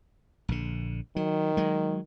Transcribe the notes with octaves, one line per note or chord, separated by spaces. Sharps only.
A#1 D3
D#3 F#3
F#3 G#3